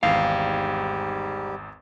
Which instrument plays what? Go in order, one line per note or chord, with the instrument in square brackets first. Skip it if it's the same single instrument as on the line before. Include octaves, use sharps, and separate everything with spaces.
[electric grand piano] G#1 E2 [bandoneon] G#2 G3 G4 [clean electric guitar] F5